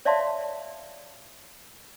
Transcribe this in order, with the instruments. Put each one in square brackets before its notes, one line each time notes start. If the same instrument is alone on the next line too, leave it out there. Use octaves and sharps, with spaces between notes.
[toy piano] C#5 D5 E5 F5 A5 C6